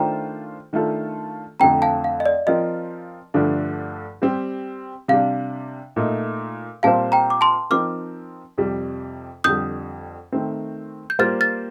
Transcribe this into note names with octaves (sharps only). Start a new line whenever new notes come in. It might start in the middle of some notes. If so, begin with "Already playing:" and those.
Already playing: D#3 A3 D4 F4 C5 G5 A#5
D#3 A3 D4 F4 A4
F2 D3 A3 C4 G5 A#5
F5 A5
F5
D#5
D5
F3 C4 F4 A#4 D#5
G2 D3 F3 A3 D4
G3 C4 G4
C3 G3 D4 F5
A#2 A3 D#4
A#2 G3 C4 F4 C5 F5 A5
G5 A#5
D6
A5 C6
F3 C4 D#4 A#4 D6 F6
F2 C3 G3
F2 D3 G3 D#6 G6
D#3 A3 C4
G6
G3 A#3 F4 C5 F6 A6
F6 A6